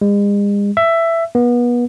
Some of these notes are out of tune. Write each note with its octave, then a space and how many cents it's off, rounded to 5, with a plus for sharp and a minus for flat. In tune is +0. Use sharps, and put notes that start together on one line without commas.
G#3 -40
E5 +10
B3 -30